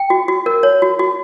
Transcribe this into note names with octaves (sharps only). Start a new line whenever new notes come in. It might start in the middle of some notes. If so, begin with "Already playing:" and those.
Already playing: G5
F#4
F#4
A#4
C#5
F#4
F#4